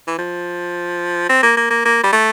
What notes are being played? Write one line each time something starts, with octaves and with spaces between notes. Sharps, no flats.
E3
F3
C4
A#3
A#3
A#3
A#3
G3
A3